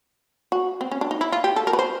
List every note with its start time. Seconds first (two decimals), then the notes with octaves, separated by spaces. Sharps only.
0.52 F#4
0.81 C4
0.91 C#4
1.01 D4
1.11 D#4
1.21 E4
1.32 F4
1.44 G4
1.56 A4
1.67 A#4
1.73 B4
1.79 C5